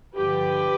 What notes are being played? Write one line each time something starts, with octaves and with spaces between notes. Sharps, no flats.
G2 D3 F3 G4 B4